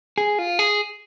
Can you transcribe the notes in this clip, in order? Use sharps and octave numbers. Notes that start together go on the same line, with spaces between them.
G#4
F4
G#4